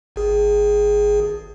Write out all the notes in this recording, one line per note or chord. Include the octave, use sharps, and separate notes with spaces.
G#1 G#4